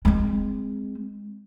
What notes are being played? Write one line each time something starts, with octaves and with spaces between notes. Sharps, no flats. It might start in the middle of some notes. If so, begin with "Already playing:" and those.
G#3 C4